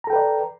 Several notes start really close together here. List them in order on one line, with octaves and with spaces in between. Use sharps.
A#5 A4 G5 B4 D5